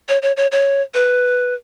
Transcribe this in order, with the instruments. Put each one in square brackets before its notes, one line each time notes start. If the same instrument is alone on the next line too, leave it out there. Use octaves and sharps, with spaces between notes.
[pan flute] C#5
C#5
C#5
C#5
B4